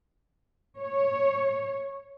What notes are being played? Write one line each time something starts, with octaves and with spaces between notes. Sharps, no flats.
C#5